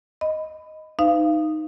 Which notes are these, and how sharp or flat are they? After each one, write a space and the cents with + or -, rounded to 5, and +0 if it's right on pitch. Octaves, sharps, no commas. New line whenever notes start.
D#5 +0 B5 +20
D#4 +0 B4 +45 F5 -25